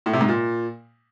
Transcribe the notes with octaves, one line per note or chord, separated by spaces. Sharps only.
A2
C3
G#2
A#2